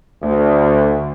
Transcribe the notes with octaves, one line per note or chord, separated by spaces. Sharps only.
D2